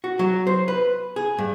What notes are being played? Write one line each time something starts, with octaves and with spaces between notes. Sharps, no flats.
F#4
F#3
C5
B4
G#4
G2